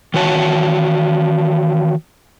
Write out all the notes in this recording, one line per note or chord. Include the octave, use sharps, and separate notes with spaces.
D#3 E3 F#4 C#5 F#5 A5